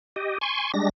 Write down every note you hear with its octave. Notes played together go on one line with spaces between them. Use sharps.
G4 D#5
G#5 C6 C#6
G3 G#3 D4 A#6